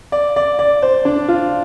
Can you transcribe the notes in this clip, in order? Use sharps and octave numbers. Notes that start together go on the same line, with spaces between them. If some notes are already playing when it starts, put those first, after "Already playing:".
D5
D5
D5
C5
D4
F4